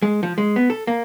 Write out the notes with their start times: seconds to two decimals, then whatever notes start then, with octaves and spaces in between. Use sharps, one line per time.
0.02 G#3
0.23 F3
0.38 G#3
0.56 B3
0.70 A4
0.87 A#3